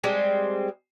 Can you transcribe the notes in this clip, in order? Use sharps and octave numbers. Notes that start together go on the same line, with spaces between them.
G3 G#3 C4